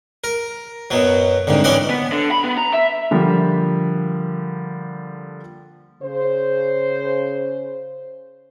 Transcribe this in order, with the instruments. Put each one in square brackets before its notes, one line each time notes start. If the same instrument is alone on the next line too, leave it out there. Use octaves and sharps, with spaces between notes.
[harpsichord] A#4
F#2 B2 F#3
C2 G#2 D3
E3 C#4 D4 D5 D#5 F#5
[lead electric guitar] B3
D3
B5
B3
A#5
E5
[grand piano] D3 F3 G3 A#3
[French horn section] C#3 C5